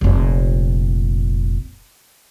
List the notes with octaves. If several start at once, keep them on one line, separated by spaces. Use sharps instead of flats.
F1 A#2